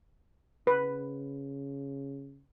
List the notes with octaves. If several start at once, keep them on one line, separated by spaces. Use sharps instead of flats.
C#3 B4